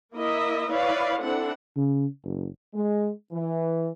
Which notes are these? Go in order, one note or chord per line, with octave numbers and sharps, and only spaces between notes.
A#3 E4 A#4 D#5 E5
E4 B4 C#5 D5 F5
C4 D4 E4 A4 F#5
C#3
F#1
G#3
E3